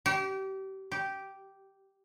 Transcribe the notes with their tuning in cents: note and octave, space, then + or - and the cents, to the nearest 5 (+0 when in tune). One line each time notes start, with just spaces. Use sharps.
G4 -30
G4 -10